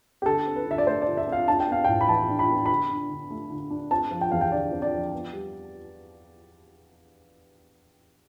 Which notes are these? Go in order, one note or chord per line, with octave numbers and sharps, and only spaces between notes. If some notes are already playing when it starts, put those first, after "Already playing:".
G4
D3 A4
C4
B4
D3 E5
D5
A3 C5
D5
D3
E5
C4
F5
D4 A5
G5
B3 F5
A2 G5
B5
E3 A5
D4
B5
B3
D3 B5
D4
D3
A3
D3
D4
C4 A5
F3
G5
E2 F5
G5
D3 D5
C4
D5
F3
B3
G3